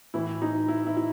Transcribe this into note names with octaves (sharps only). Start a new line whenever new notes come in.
A2 E3 E4
D#4
E4
E4
E4